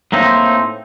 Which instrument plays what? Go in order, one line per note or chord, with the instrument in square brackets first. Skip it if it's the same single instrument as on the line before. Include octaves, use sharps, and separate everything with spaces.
[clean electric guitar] A2 A#3 C4 D#4